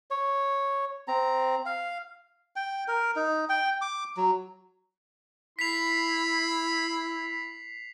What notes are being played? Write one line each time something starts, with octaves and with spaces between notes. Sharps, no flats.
C#5
C4 A#5
F5
G5
A#4
D#4
G5
D6
F#3
E4 B5 B6 C7 F7